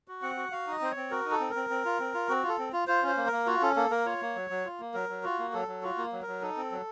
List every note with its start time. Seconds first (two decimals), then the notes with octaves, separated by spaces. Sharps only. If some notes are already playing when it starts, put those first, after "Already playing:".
0.08 F#4
0.22 C4 F#5
0.37 F#4
0.52 F#4 F5
0.67 D#4 D#5
0.81 C4 C5
0.91 C#5
0.97 C4
1.11 F#4 A#4
1.26 D#4
1.31 A4
1.40 C4
1.50 A#4
1.55 C4
1.70 C4
1.85 F4
1.99 C4
2.14 F4
2.29 C4 F#4
2.43 F4
2.48 A4
2.58 C4
2.73 F4
2.87 F4 C5
3.03 C#4 C5
3.17 A#3
3.27 A#4
3.32 A#3
3.47 F4 F#4
3.62 C#4 A4
3.76 A#3 A4
3.91 A#3 A#4
4.06 F4 C#5
4.21 A#3
4.36 F#3
4.50 F#3
4.65 F4
4.80 A#3
4.94 F#3 A#4
5.09 F#3
5.23 F4 F#4
5.39 A#3
5.53 F#3 A4
5.68 F#3
5.83 F4 F#4
5.98 A#3
6.13 F#3
6.22 A#4
6.27 F#3
6.42 D#4 A4
6.57 C4
6.72 F#3